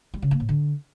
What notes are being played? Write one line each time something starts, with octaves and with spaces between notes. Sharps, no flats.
G3
C#3
A#3
A2
D3